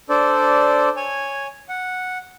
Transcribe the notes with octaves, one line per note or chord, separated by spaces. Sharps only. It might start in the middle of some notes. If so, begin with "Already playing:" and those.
D4 A4 C5 D5
C#5 G#5
F#5